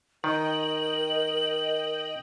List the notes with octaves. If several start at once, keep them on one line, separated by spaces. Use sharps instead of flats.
D#3 A#4 D#5 G5 F#7